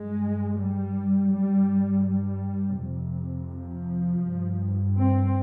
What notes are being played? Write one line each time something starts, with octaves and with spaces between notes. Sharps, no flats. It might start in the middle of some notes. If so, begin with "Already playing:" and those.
Already playing: G2 G#3
G3
G2 G3
G3
F2 C3
F3
G2
C4